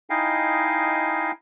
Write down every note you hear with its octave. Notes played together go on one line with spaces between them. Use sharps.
D#4 E4 D#5 F5 G5 G#5